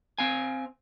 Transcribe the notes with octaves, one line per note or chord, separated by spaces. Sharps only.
C4 F5 G#5